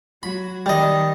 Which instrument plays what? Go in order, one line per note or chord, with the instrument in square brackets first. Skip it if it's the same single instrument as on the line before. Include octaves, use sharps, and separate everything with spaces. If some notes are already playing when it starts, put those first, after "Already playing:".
[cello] F#3 F#4 [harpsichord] B5
[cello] D#3 [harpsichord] G3 D#5